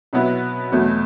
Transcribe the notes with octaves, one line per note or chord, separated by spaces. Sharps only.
B2 F#3 B3 E4
E2 B2 F#3 A3